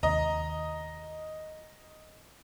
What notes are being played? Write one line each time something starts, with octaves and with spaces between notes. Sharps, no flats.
D#2 C3 D#5 A#5